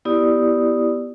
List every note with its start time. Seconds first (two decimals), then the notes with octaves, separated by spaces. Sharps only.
0.05 B3 E4 G4 D5 D#6